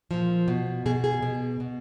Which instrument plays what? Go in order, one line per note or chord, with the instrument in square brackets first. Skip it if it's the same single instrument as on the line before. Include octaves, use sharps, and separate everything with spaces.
[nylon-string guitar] A#2 F3
B2
B2 G#4
G#4
B2
B2